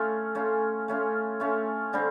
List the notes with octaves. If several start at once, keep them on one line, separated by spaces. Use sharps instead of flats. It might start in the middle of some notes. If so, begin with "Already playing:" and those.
Already playing: A3 C#4 F4
A3 C#4 F4
A3 C#4 F4
A3 C#4 F4
D3 G3 C4